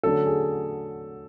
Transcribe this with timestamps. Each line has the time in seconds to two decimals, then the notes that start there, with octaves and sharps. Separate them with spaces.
0.04 D3 F#3 A3 C#4 A4
0.26 G#4